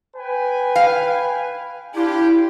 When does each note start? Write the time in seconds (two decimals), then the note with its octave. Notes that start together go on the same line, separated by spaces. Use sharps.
0.17 B4 G5 G#5
0.76 F5
1.95 D4 E4 F4 G4